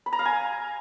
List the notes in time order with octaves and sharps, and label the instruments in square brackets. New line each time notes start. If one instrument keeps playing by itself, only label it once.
[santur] B5
A#5
F5
G#5